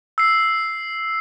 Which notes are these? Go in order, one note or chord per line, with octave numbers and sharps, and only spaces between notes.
E6 C7